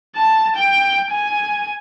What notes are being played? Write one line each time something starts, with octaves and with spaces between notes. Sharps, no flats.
A5
G5
G#5